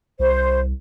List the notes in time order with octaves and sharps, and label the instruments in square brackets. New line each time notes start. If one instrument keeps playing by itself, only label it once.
[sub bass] C2 [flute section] C5